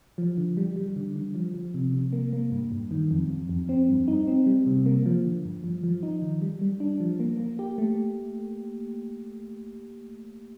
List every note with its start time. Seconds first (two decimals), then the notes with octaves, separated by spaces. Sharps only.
0.18 F3
0.37 D3
0.57 G3
0.76 G3
0.96 D3
1.16 D3
1.35 F3
1.54 F3
1.74 C3
1.94 C3
2.13 A#3
2.33 A#3
2.52 G2
2.72 G2
2.91 D#3
3.11 F2
3.30 F2
3.49 F2
3.69 C4
3.89 G2
4.08 D#4
4.27 C4
4.46 G3
4.66 C3
4.86 A#3
5.06 F3
5.25 D3
5.45 G2
5.64 F3
5.84 F3
6.03 D#4
6.22 D#3
6.42 G3
6.61 G3
6.80 D4
7.00 F3
7.20 A#3
7.40 A#3
7.59 G4
7.78 A3